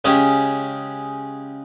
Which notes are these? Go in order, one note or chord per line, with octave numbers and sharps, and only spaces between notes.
C#3 G#3 C#4 G4